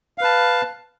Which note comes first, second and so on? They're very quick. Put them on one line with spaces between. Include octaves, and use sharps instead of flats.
F5 B4 A5